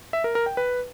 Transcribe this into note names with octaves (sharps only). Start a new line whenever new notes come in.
E5
A#4
A#4
G5
B4